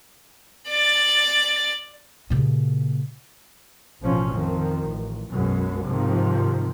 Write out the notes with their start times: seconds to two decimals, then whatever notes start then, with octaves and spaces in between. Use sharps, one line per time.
0.70 D5 A6
2.30 A#2 C#3
4.01 A1 B2 F3 C#4
4.31 F2 D#3 F3
4.87 A1
5.30 B1 F#2 B2 G#3 B3 C#4
5.85 G#2 C3 D#3 F3